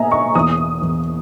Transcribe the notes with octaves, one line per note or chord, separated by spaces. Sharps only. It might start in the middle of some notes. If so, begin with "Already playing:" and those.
Already playing: B2 A#3 D#5 E5 G#5 A#5
C#6
E2 D#6
E2